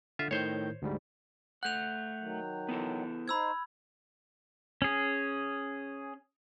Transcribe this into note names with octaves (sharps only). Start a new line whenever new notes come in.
D3 F4 E5
A2 D#3 C5 C#5 G6
D2 G#2 G3
A3 F#5 F#6 G6 F7
D#3 F#3
B3 E4 A4
D#4 C5 B5 E6 G#6
C#4 G#4